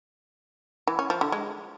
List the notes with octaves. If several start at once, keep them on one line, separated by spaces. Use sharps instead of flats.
E3
C#4
F3
D3
G#3